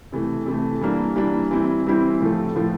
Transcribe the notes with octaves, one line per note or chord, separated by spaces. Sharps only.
C3 E3 A3
C3 E3 A3
E3 G3 A#3 D4
E3 G3 A#3 D4
E3 G3 C4 E4
E3 G3 C4 E4
A2 F3 A3
A2 F3 A3